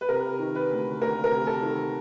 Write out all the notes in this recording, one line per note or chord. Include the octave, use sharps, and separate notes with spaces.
B4
C3 A#4
D#3
B4
D2
D2 A#4
A#4
C3
A4
D#3